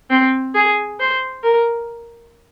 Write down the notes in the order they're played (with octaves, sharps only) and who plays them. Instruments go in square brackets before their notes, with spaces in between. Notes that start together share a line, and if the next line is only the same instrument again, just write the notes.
[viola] C4
G#4
C5
A#4